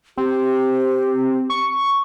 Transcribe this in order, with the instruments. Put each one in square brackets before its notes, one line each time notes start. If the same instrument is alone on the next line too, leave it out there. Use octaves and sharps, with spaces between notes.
[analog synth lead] C4 [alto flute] G4
[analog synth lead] C#6